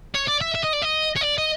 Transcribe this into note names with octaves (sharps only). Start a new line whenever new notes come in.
C#5
D5
E5
E5
D#5
D5
D#5
C#5
D5
D#5